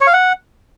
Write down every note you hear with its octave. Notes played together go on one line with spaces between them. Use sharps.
C#5
F5
F#5